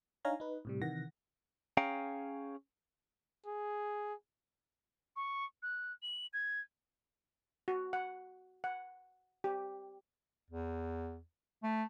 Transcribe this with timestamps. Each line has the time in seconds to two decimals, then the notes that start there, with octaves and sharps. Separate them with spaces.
0.25 D4 D#4 C#5 F5 G#5 A#5
0.40 D#4 B4
0.65 A2 C3 G3
0.82 C3 D#3 E3 F#5 A#6
1.77 C#4 G#4 F5 G5 A#5
3.46 G#4
5.16 C#6
5.63 F#6
6.02 F#7
6.33 G#6
7.68 F#4
7.93 F#5
8.64 F#5
9.44 G4
10.50 E2
11.63 A3